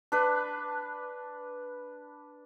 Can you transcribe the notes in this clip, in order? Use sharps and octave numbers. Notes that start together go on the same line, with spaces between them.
D4 B4